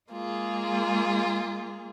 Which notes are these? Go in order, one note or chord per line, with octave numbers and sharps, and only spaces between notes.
G#3 A#3 F4 G#4